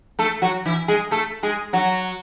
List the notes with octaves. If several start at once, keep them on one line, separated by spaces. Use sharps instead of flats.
A3 A4
F#3 F#4
E3 E4
G#3 G#4
A3 A4
G#3 G#4
F#3 F#4